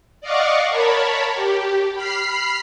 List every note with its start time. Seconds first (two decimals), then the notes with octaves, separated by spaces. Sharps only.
0.21 D5 D#5 F5 F#5 C#6 D6
0.69 A#4 C#5 A5 B5
1.35 G4
1.94 B5 F6 C7